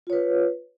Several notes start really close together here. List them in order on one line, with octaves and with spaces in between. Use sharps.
F4 C#5 B4